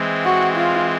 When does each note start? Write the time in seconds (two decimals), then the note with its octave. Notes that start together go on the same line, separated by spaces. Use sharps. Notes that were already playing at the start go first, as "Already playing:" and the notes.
Already playing: E3 G#3 C4
0.25 F#4
0.57 F4